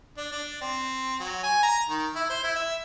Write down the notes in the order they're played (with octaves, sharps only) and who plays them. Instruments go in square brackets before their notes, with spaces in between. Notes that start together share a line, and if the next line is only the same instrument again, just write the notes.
[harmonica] D4
D4
C4
F#3
G#5
A#5
D#3
E4
C5
E4
E5